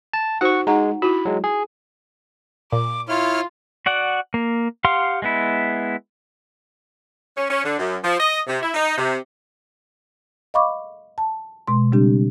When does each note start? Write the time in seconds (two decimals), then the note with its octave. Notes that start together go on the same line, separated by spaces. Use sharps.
0.13 A5
0.41 D#4 F#4 C5 F#5 C#6
0.67 G#3 D#4 F#5 A#5
1.02 E4 F#4 B5
1.25 F#3 G#3
1.44 G#4
2.73 A#2 D6
3.09 E4 F4 C#5 F6
3.86 F#4 D5 F#5
4.34 A#3
4.85 G4 F5 F#5 C6 F6
5.22 G#3 B3 E4
7.36 C#4
7.50 C#4
7.64 D3
7.79 F#2
8.02 F3
8.18 D#5
8.47 C3
8.62 E4
8.74 D#4
8.98 C3
10.54 D#5 F5 B5 C#6 D6
11.18 A5
11.67 B2 G#3 C6
11.92 C#3 G3 C4 D4 G4